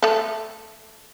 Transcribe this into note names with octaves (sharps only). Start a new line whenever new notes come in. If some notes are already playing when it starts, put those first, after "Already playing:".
A3 A4